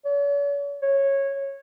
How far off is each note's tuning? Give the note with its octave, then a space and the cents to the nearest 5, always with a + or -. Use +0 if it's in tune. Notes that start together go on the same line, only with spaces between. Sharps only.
C#5 +45
C#5 -15